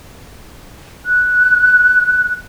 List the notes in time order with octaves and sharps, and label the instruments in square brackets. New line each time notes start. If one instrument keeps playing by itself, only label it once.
[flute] F#6